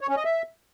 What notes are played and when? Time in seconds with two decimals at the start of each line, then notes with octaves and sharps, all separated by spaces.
0.01 C#5
0.09 C#4
0.17 D#5
0.25 E5